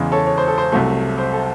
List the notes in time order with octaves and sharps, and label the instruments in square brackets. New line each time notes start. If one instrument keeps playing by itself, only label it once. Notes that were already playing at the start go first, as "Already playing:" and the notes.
Already playing: [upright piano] E2 C#3 E3 G#3
A4 C#5
C#5
C5
A4
C5
C2 C3 F#3 A3
C5
A4